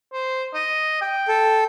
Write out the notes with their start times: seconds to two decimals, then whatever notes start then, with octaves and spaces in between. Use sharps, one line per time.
0.13 C5
0.54 D#5
1.02 G5
1.28 A4